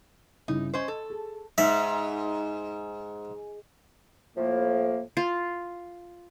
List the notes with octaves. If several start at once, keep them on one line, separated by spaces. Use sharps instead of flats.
G1 C#3 D#4 E4
C#4 C5 D#5
A4
G#4
G#2 E5
A2 F3 A#3
F4